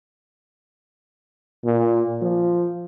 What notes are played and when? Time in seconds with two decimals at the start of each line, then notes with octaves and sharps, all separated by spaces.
1.65 A#2
2.22 F3